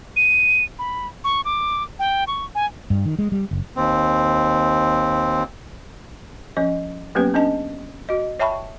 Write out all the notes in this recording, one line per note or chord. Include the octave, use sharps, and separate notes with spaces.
D#7
B5
C#6
D6
G5
C#6
G#5
G2
D#3
G#3
G3
F#1
D#2 C4
F3 C#4 D#5
F#3 A#3 B3 C#4 G4 B4
C#4 D4 D#5 A5
F#4 D#5
C#5 E5 G5 A5 B5 C#6